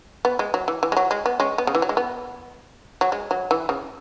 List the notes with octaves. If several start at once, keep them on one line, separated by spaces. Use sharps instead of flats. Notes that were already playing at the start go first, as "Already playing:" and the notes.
B3
G#3
F#3
E3
E3
G#3
F#3
G#3
B3
G#3 C#4
B3
C#3
E3
F#3
G#3
B3
F#3
G#3
F#3
E3
C#3